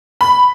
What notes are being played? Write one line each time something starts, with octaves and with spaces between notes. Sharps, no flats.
B5